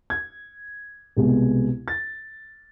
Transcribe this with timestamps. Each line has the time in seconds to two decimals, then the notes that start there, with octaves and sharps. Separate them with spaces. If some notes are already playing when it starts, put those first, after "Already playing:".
0.10 G#6
1.17 C2 B2 G#3 B3
1.88 A6